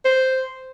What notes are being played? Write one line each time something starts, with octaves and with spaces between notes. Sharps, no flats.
C5